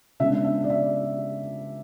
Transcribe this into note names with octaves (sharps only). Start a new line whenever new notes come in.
C#3 G#3 B3 D4 E5
E5
D5
E5